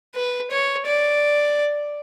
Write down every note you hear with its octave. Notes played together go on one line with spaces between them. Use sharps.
B4
C#5
D5